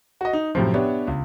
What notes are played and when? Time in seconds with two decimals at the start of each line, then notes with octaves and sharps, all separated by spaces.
0.21 F#4 D#5
0.33 D#4
0.55 F#2 A2 C3 F3
0.74 B3 D4 G4 C#5 E5
1.08 C#2